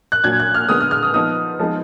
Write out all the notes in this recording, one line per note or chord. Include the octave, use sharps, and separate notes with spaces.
F#6
A#2 F#3 D4 G#6
F#6
F6
D3 G#3 B3 D#6
F6
F6
D#6
F3 B3 D#4 D#6
F3 G#3 B3 D#4